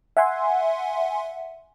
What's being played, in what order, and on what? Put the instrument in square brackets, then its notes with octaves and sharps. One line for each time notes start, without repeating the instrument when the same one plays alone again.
[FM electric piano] E5 F#5 G#5 C6